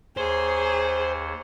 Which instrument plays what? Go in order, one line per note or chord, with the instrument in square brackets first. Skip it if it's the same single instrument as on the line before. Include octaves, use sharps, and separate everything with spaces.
[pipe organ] D#2 C#5 [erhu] G#4 [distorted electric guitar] C5